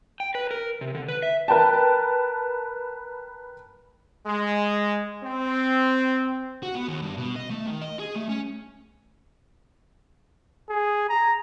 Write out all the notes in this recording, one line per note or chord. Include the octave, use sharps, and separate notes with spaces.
G5
B4
A#4
C3
D3
B4
E5
A#4 B4 G5 A5
G#3
C4
F#4
B3
D#2
G2
B2
D#5
A3
D#3
D#5
G#4
A3
C#4
G#4
A#5